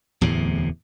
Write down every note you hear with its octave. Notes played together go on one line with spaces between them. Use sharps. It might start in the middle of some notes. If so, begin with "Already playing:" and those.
D1 E2 A2 C3